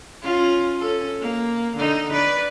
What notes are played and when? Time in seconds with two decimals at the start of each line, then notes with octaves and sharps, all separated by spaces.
0.22 C#4 F4
0.79 C#4 A4
1.21 A#3
1.77 D3 D#4
2.12 B4 D5